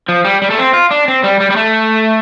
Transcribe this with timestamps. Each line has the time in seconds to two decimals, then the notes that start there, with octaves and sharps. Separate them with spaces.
0.09 F3
0.24 G3
0.42 G3
0.50 A3
0.58 C4
0.74 F4
0.91 D4
1.08 C4
1.23 G3
1.40 G3
1.50 G3
1.56 A3